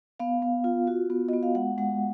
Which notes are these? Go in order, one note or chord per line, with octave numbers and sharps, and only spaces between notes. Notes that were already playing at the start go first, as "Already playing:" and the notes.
B3 F5
B3
F4
F#4
B3
B3 D#5
F5
G#3 F#5
G#3 F#5